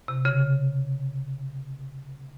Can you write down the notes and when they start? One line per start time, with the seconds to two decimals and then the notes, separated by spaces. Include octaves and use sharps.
0.08 C3
0.25 C#3